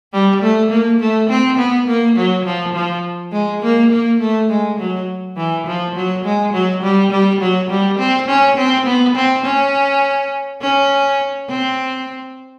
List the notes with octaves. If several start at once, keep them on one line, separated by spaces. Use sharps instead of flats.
G3
A3
A#3
A3
C4
B3
A#3
F#3
F3
F3
G#3
A#3
A#3
A3
G#3
F#3
E3
F3
F#3
G#3
F#3
G3
G3
F#3
G3
C4
C#4
C4
B3
C4
C#4
C#4
C4